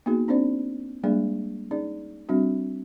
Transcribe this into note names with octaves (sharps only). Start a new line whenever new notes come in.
A#3 B3 D#4 F#4 G#4
C4 D4 D#4 C5 D5
G3 G#3 A#3 D4 G#4 D5
C#4 D#4 G#4 D5
G3 C4 D4 F#4